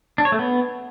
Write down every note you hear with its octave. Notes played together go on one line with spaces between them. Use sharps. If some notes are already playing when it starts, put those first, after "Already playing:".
D4
C#5
A3
B3